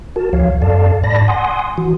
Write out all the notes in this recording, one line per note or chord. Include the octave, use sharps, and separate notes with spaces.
F#4 A#4 A5
D2 F3 C#5 F5
F#2 A4 D5 F5 A5
G#2 D5 A5 B5 A#6
F#5 G#5 C6 D#6
E3 F#4